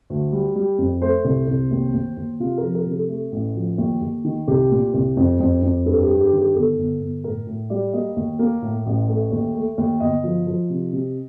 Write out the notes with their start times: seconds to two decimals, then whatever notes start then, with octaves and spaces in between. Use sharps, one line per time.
0.10 D2
0.32 G3
0.56 G3
0.78 F2
1.02 A3 C5
1.25 C2
1.48 C2
1.71 D#2
1.93 D#2
2.17 D#2
2.40 C3 F4
2.57 A#4
2.63 F3
2.75 A#4
2.86 C3
2.92 A4
3.09 A3
3.32 A1
3.56 F3
3.78 D#2
4.01 D#2
4.24 D#3
4.48 C2 G4
4.71 A#2
4.94 C2
5.17 F2
5.40 F2
5.62 F2
5.86 G2 A4
6.03 G4
6.09 G2
6.20 G4
6.32 D#3
6.38 G4
6.55 G1 A4
6.78 G1
7.01 G1
7.24 A2 A#4
7.47 A2
7.70 G3 D5
7.93 A#3 D#5
8.16 D#2
8.39 A#3
8.62 A2
8.86 A1
9.09 A3
9.31 D#2
9.55 A3
9.78 D#2
10.00 G1 D#5
10.24 F3
10.47 F3
10.70 C3
10.93 C3